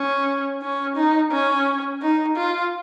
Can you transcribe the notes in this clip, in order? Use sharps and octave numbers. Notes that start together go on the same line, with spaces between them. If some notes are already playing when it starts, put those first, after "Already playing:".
Already playing: C#4
C#4
D#4
C#4
D#4
F4